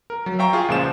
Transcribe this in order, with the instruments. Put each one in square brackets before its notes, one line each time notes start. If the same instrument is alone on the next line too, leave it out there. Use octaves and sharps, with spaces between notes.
[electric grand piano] A#4
F#3
E5 F5 G5 A#5 C#6
F4 G#4
C#2 A#2 F3 C5 E7